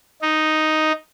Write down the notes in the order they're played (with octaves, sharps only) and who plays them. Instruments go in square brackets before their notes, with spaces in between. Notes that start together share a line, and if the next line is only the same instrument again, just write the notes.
[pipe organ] D#4